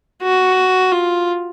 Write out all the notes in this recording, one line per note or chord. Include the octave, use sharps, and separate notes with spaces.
F#4
F4